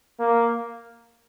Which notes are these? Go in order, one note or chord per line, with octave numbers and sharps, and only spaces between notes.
A#3